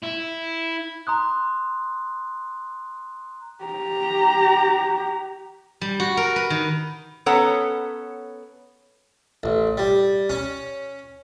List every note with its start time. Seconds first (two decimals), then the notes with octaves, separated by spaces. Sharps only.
0.03 E4
1.07 A#5 C6 D#6 F#6
3.65 G4 A#5
5.81 G3
6.00 F#4
6.17 A#4
6.36 B4
6.50 D#3
7.26 B3 C#4 A4 C#5 F#5 A#5
9.43 A1
9.78 G3
10.30 C#4